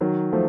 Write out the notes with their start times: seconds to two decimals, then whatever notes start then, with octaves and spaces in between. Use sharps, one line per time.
0.01 D#3 F#3
0.33 F3 A3